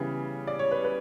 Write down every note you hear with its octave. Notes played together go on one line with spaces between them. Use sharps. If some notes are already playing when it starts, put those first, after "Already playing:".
Already playing: C#3 E3 G3 B3
D5
C#5
B4
B4